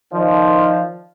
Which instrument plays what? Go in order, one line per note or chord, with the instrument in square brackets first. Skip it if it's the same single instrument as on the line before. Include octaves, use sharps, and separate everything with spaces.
[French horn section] D#3 D5 D#5 [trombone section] F3